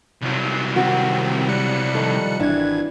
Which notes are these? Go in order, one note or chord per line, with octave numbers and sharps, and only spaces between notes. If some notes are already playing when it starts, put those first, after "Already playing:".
C2 F#3
D#3 C4 F#4
G3 F#6 C#7
D#3 F3 A4
G#1 E3 D4 E4 G#6